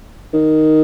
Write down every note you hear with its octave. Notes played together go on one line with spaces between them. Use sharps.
D#3